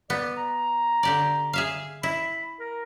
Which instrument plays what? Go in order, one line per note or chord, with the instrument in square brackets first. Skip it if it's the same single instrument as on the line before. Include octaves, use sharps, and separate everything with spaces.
[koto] B3 [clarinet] D5
[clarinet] A#5
[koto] D3 G4 D5
G#4 E5 F5
[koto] E4 [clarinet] B5
[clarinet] A#4